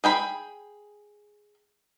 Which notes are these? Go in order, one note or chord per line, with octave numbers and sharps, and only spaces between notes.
G#4 G5 B5